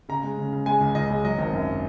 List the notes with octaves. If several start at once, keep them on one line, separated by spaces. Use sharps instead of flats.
C#3 A#5
G#3
C#3
C#3
G#3 G#5
C#2
C#2 D#5
G#3
F#3 D#5
G#1
F#2